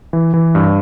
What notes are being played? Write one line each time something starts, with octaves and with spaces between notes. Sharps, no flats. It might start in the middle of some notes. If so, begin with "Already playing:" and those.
E3
E3
G2